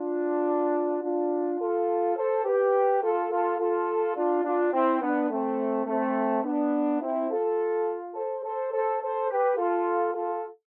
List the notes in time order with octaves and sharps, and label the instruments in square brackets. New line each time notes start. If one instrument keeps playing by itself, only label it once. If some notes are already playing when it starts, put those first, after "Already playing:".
Already playing: [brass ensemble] D4 F4
D4 F4
F4 A4
A4 C5
G4 B4
F4 A4
F4 A4
F4 A4
D4 F4
D4 F4
C4 E4
B3 D4
A3 C4
A3 C4
B3 D4
C4 E4
F4 A4
A4 C5
A4 C5
A4 C5
A4 C5
G4 B4
F4 A4
F4 A4